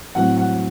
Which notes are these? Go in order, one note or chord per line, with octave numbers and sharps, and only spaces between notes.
A2 F#3 C4 F#5
F#5